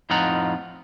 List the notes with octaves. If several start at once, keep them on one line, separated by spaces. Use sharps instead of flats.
F2 A2 D#4 F4 F#5 A#5